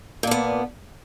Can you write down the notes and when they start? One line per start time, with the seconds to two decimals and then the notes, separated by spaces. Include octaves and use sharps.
0.23 A#2
0.27 D4
0.31 B3